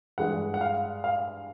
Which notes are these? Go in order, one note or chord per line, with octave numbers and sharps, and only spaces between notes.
G2 E3 G#3 F#5
F#5
F5
F5